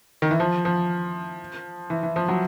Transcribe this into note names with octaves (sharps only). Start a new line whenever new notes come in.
D#3
E3
F3
F3
E3
E3
F3
F#3